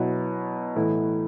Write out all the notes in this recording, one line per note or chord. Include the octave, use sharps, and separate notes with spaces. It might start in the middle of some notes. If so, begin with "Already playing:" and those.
Already playing: B2 F#3 B3 E4
A2 E3 A3 E4